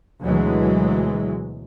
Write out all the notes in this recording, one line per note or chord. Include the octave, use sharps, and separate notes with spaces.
D2 B2 E3 F#3 G#3